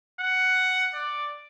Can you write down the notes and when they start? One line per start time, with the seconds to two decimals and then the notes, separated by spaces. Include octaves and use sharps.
0.20 F#5
0.94 D5